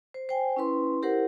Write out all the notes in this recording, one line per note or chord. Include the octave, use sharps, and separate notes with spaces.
C5
C5 G5 G#5
C#4 E4 B4 C6
E4 G4 A#4 C5 F#5